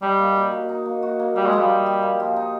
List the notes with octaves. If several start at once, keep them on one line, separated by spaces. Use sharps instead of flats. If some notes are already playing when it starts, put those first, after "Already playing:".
G3 D#4
A#3
F#4
A#3
D#4
A#3
F#4
A#3
G3 A#3
G#3
F3
G3
D#4
G4
A#3
F3
D#4